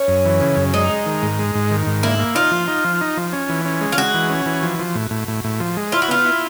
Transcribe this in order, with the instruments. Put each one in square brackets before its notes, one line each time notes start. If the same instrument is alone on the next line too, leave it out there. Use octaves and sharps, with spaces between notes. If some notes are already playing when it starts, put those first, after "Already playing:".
Already playing: [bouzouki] C#4
[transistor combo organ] F#2
E3
C#3
F#2
[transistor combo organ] G#3 [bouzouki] D#4
[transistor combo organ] G#3
D#3
G#2
G#3
G#2
D#3
G#2
[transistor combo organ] A#3 [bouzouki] E4
[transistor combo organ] A#3
[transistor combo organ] D#4 [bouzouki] F4
[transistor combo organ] F3
D#4
F3
D#4
F3
C#4
E3
C#4
G#3
[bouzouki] F4
[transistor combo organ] G#3 [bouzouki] F#4
[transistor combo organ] E3
C#4
E3
F3
F3
A2
A2
A2
A2
F3
G#3
[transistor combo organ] E4 [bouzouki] F4
[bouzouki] F#4
[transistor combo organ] B3 [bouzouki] F4
[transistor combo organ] E4